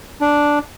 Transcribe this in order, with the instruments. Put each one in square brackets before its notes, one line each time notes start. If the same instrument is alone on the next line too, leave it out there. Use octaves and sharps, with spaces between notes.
[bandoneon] D4